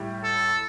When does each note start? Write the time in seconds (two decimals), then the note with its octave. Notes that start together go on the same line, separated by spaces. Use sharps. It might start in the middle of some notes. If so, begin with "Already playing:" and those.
Already playing: A2 G3 E4 G4
0.24 A4